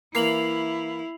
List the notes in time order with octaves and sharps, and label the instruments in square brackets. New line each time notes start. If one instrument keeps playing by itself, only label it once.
[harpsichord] E3 A#3 [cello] E4 [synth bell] C7 F7 F#7